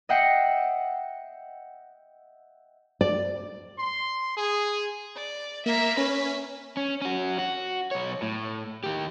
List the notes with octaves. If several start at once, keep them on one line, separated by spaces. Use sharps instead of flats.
D#5 E5 F#5 G5 C7 C#7
D5
C6
G#4
D5
A#3 E5 A#5
C#4 B4 B6
C#4
C#4 F#4
F#4
B1 C#5
A2
D#2 G4